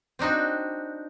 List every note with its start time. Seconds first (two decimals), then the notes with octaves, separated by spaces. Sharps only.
0.19 C4 D4 D#4 F#4